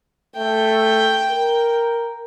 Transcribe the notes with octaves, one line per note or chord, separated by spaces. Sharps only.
A3 G5
A#4